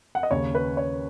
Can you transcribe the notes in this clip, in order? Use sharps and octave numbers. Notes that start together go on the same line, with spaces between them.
F#5
D#5
D#2 C#3 C#5
B4
C#5